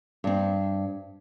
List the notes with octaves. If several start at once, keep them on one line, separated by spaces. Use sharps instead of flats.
G2 C4